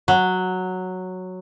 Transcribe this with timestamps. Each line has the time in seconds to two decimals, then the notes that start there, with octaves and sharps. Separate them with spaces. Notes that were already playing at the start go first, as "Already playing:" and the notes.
0.08 F#3